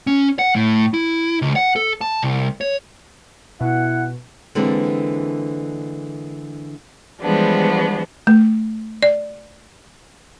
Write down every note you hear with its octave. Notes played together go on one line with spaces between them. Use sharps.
C#4
F#5
A2
E4
C#2
F#5
A4
A5
C2
C#5
B2 E4 F#5
D3 E3 G#3 A#3 C4 D4
E3 F3 G3 G#3 B3 D4
A3
D5